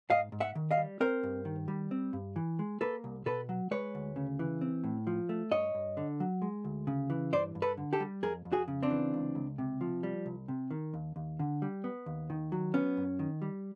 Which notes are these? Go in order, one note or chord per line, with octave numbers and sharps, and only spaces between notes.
G#2 D#5 F5
G#2
E5 F#5
D#3
D#5 F5
G3
C4 A#4 C5
G2
D#3
G3
C4
G2
E3
G#3
A#3 A4 B4
C2
B2 A4 B4
F#3
G#3 B4 C#5
D2
C#3
E3
C4
A2
F3
A3
G2 C#5 D#5
G2
D3
F#3
G#3
D2
C#3
E3
G2 C5 D5
G2
A4 B4
D3
G4 A4
G3
F2 G#4 A#4
F2
F#4 G#4
C#3
C4 D4
E3
C#2
C#2
C3
F3
G3
C2
C3
D#3
D#2
D#2
D3
G3
B3
D#2
D#3
F#3
B3 C#4
F#2
D#3
G3